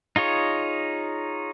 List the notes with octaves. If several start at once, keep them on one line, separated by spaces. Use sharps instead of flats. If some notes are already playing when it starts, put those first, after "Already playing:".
D#4 F4 G#4 C#5